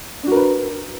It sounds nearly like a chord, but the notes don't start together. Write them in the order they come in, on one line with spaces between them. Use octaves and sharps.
D4 F#4 A#4 B4